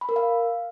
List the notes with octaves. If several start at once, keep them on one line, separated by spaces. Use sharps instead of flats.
B5
A#4
F5